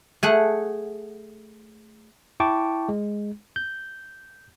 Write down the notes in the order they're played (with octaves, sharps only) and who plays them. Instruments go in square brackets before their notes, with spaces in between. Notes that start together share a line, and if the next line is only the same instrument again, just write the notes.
[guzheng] A3 G#4 F#5
[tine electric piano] E4 G5 A5 C#6 D6
G#3
G6